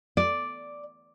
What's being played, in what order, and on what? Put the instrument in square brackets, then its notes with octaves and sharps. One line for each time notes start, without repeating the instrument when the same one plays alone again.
[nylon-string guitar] D5